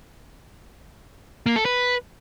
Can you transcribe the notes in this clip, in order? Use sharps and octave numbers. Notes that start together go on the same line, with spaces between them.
A#3
A4
B4